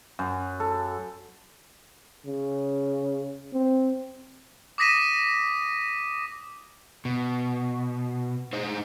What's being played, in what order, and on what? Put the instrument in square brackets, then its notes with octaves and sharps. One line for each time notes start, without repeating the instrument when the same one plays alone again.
[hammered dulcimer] F#2
A4
[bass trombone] C#3
C4
[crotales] D6 D#6 A#6 B6 D#7 E7
[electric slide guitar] B2
D#4 G#4 C5 D#5